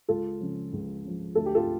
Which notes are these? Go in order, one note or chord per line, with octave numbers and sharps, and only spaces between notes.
C#2 F4 A4
C#3 F3
C#2
C#3 F3
D2 A4
G4
F4 A4